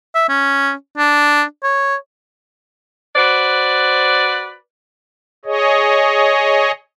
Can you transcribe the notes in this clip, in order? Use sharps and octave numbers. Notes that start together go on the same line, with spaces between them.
E5
C#4
D4
C#5
F#4 B4 C5 D5
G#4 C#5 D#5